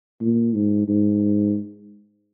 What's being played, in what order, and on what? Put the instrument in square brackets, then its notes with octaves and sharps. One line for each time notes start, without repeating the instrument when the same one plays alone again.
[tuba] A#2
G#2
G#2